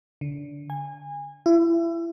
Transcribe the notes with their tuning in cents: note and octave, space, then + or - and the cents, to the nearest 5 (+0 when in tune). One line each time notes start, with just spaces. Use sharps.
D3 -25
G#5 -25
E4 +30